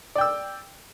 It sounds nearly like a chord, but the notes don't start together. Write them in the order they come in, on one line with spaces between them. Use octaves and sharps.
D5 G5 E6